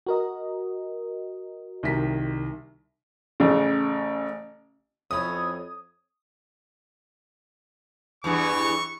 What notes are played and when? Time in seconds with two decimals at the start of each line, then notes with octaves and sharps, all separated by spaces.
0.07 F#4 A#4 D#5
1.83 C2 D#3 B6
3.40 A1 C#3
5.11 F2 C#4 E4 C#5 D#6
8.24 E2 G2 E3 C#6